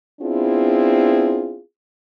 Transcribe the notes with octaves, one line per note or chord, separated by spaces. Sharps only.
B3 C4 D4 E4 F4 G#4